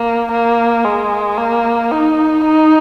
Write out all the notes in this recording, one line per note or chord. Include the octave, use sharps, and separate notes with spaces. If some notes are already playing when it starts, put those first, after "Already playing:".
Already playing: A#3
A#3
G#3
A#3
D#4
D#4